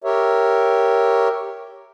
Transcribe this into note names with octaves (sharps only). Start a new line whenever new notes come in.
G4 A#4 C#5 E5